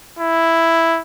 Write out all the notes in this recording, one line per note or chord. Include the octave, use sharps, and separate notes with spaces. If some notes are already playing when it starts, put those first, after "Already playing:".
E4